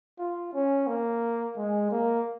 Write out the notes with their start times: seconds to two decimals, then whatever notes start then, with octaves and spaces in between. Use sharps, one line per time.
0.19 F4
0.53 C#4
0.87 A#3
1.56 G#3
1.91 A#3